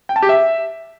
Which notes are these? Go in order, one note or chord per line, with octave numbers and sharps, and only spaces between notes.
G5
A5
G4
E5